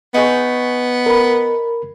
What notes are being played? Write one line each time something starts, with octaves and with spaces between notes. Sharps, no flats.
B3 D#4 G#4 C#5
A#4 B5